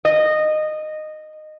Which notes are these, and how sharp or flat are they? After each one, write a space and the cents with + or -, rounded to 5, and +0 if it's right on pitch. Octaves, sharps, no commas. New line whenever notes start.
D#5 -15